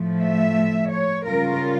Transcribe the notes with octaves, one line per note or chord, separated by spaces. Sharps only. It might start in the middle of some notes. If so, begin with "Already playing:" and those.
Already playing: A2 F3 A3
E5
C#5
C#3 G3 C#4 F4 A#4